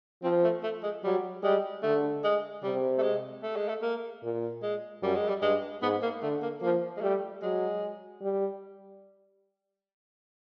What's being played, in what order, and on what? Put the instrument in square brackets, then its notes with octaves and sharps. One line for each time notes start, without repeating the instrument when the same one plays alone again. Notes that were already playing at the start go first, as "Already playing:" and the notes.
[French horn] F3 [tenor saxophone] C4
[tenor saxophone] A3
A3
G#3
[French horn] F#3 [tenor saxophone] G3
[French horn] G3 [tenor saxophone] G#3
[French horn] D3 [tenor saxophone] A3
[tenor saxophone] G#3
[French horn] C3 [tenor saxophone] G3
[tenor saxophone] A3
G#3
A3
G#3
A3
A#3
[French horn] A#2
[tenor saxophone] G#3
[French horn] F#2 [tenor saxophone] G3
[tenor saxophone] G#3
G3
[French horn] G2 [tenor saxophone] G#3
[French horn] G#2 [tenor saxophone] B3
[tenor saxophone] A#3
[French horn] D3 [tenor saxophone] A3
[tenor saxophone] A#3
[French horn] F3 [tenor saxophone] A#3
[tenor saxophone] G#3
[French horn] G3 [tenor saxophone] A3
[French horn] F#3 [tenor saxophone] G#3
[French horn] G3